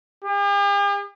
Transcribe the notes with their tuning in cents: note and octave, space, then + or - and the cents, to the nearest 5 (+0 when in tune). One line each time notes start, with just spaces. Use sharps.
G4 +45